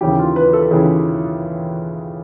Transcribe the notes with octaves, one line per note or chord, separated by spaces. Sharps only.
D#2 C#3 E3 G4
F4
B4
A4
D#2 C#3 E3 G#4